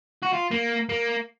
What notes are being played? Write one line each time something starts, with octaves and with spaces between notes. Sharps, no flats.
F#4
F4
A#3
A#3